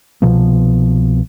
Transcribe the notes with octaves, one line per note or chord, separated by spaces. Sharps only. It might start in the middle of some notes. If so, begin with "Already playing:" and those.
C2 B2 F3 B3